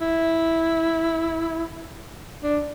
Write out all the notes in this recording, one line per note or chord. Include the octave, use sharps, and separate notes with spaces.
E4
D4